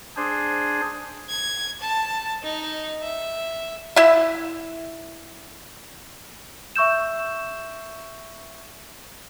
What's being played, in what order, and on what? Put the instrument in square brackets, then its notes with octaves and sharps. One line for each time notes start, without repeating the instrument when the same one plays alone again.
[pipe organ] D4 G#4 C5
[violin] G#6
A5
D#4
E5
[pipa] E4 E5
[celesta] E5 C#6 E6 G6 E7